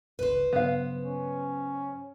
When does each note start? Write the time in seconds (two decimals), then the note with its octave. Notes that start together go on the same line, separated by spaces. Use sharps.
0.19 G1 C#2 C#3 B4 C5
0.53 G2 C#3 F#3 B3 F5
1.04 C#4